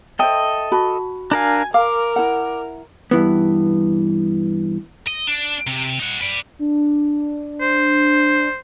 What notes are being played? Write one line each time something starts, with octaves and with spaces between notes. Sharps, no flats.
A4 C5 D#5 E5 G5
F#4 A5 B5
D4 A#4 F5 G#5
A#4 F5 D6
E4 F#5
G2 E3 B3
D#5
D4
C3
D#4 F#5
B4 D5
D4
C5